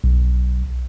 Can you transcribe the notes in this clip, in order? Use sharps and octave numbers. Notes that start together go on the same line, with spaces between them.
B1